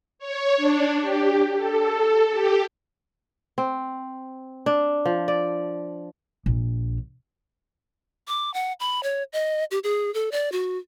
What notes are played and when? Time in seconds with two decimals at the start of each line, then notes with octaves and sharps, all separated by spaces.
0.19 C#5
0.57 D4
1.01 G4
1.56 A4
2.33 G4
3.58 C4
4.66 D4
5.05 F3
5.28 D5
6.46 A#1
8.28 D6
8.54 F#5
8.80 B5
9.03 C#5
9.33 D#5
9.71 G4
9.84 G#4
10.14 A4
10.32 D5
10.52 F#4